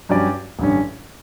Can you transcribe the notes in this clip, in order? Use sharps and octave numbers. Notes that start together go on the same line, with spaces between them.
G2 F#3 C#4 G4 D5
A1 G2 D3 G3 C#4